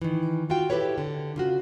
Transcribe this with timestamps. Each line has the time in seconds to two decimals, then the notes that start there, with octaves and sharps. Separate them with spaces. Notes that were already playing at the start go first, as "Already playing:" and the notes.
0.02 D#3 E3
0.50 F4 F#4 F5 G5
0.70 E4 G4 A4 B4 C#5
0.98 D3
1.36 C#3 F4 F#4